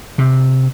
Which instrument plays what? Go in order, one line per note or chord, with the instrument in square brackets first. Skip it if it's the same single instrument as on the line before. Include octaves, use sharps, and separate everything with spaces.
[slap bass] C3